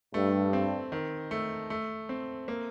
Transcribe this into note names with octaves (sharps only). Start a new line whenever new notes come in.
G2 A3
C4
D#3
A3
A3
C4
A#3